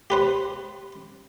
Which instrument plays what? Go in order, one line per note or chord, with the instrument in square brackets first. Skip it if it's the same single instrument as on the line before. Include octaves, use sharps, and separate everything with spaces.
[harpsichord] G4 B4 C5